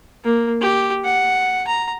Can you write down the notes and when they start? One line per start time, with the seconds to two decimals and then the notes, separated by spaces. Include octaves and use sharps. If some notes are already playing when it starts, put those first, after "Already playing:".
0.25 A#3
0.61 G4
1.05 F#5
1.67 A#5